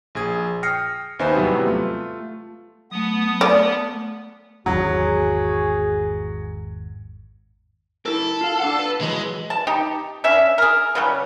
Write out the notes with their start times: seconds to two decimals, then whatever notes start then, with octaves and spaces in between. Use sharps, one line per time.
0.15 A#1 G#4 G#6
0.63 G5 D#6 F6 A#6 C7 C#7
1.19 D#2 B3 D#4 C5 E5 G#5
1.35 E2 A2 C3 F#3 G3 B3
1.66 A3 F4
2.91 F#3 A3 B3 D#6
3.41 A3 D5
4.66 G#1 E2 F#3 F#4 G#4
8.06 E4 A4 A#4
8.41 F4 F5
8.59 D4 F5 F#5
8.79 B4
9.01 E3 F#3 G#3 B4
9.50 A5
9.67 D#4 G4
10.24 C#4 D4 E5
10.58 G#4 A#4
10.95 C#3 F#3 G3